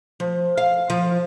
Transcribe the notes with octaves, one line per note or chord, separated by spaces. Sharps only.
F3
F5
F3